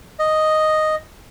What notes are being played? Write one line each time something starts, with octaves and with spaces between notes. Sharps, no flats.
D#5